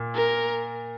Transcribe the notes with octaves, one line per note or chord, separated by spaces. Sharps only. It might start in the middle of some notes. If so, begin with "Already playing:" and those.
Already playing: A#2
A#4